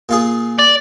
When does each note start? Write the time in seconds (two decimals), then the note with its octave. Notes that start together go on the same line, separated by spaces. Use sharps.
0.09 A#2 F4 G#4
0.59 D5